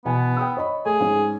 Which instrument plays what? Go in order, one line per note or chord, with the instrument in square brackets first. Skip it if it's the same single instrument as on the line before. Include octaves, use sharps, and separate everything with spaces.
[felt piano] B2 E3 G#5 [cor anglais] B3
[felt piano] G5 D#6 E6
C#5 D#5 B5
[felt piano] A3 [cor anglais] G#4
[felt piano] G#2 C#4